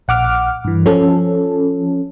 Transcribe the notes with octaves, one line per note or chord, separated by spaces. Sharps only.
A#1 F#5 D6 F6
G2 E3
F3 C#4 A4